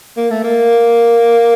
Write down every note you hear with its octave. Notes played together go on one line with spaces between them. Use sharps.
A#3
A3
A#3